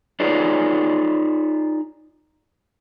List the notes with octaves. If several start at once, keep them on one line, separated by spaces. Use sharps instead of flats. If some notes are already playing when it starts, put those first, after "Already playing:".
D#4 F4 G#4 B4 C#5 D5